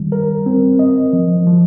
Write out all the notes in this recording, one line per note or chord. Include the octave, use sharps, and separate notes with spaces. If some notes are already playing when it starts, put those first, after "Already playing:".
Already playing: D#3 G3
A#4
C4
D#5
F3
F3